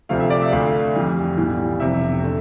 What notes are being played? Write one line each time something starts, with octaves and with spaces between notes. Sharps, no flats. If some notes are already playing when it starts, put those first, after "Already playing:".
D2 C3 F3 A3 F5
E5
D5
E5
D2 D3 A3 F5
F2 E3 G3
B1 A2 E3 G3
F1 F2 C3 E5
D3 A3